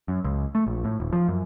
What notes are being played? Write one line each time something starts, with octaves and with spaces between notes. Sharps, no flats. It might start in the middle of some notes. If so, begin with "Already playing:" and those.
F#2
C#2
A3
A#1
A2
D#1
F3
F#2